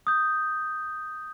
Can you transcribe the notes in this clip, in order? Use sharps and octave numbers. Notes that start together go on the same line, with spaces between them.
D#6 G6